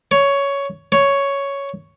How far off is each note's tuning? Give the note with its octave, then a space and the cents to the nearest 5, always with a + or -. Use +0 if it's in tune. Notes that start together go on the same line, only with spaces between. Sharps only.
C#5 +10
C#5 +5